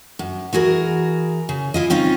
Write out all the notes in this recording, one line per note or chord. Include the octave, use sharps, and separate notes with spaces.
F#2
E3 F#4 G#4 A#4
C#3
E4 F4 D#5
C4 C#4 D#4 F4